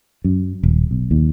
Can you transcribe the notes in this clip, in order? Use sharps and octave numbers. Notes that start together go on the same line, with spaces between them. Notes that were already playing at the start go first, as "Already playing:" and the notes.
F#2
D#1
B1
D#2